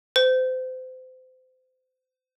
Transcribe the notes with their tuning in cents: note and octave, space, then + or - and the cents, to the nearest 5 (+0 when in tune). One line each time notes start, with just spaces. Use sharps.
C5 -30